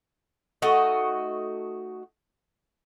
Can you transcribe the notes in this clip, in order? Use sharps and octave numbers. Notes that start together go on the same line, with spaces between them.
A3 D#4 F#4 D#5